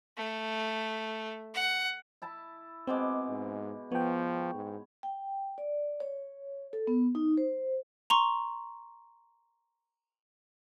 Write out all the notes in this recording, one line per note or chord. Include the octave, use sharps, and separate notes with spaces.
A3
F#5
E4 A5 B5
B2 G#3 C4 D6
G#2
F3 B3 C#5 G5
G#2
G5
D5
C#5
A4
B3
D#4
C5
A#5 C6 C#6